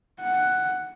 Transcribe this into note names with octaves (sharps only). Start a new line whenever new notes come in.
F#5